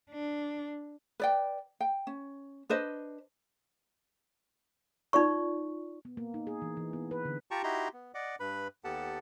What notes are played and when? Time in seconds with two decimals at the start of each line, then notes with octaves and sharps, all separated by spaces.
0.11 D4
1.20 B4 D5 G5
1.80 G5
2.07 C#4
2.69 D4 B4 C5 D#5
5.13 D#4 F4 D5 C#6
6.05 B3
6.17 A#3
6.34 D#4
6.47 G#4
6.62 E3
6.77 E3
6.93 B3
7.11 B4
7.25 D3
7.51 F4 G4 G5 A5 A#5 C#6
7.63 D#4 E4 F#4 G4 A#5 C6
7.93 B3
8.14 D5 D#5 F#5 D6
8.40 G2 B4 B5
8.84 D#2 B3 G4 A4 F#5 A5